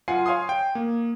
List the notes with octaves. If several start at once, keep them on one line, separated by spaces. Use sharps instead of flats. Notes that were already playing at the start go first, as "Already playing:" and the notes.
F#2 F4 F#5 G#5 C7
C#5 F5 G#5 C6 D#6
G5
A#3